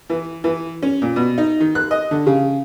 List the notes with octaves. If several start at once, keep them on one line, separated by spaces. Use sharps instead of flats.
E3
E3
C#4
A#2
B2
D#4
D#3
F#6
D#5
D3
C#3